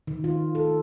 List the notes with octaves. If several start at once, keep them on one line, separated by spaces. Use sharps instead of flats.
D#3
F4
A4